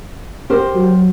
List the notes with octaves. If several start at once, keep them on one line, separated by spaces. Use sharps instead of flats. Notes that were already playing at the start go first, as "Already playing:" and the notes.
G4 A#4 C5
F#3